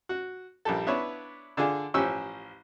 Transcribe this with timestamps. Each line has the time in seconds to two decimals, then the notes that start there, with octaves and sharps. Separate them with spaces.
0.09 F#4
0.65 A#1 G3 G4 A4
0.87 B3 D4 E4 B4 C#5
1.57 D3 D4 F4 G#4
1.94 A1 F3 C#4 G4 C#6 E6